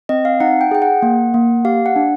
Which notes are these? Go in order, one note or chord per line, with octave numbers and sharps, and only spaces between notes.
C4 D#5
F5
D#4 F#5
G5
G#4 G5
F#5
A#3
A#3
G4 F5
F#5
D4